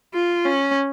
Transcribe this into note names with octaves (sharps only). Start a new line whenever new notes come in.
F4
C#4